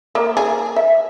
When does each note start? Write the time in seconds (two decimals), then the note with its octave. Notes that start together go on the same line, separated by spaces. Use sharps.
0.15 A#3
0.37 G#4
0.76 E5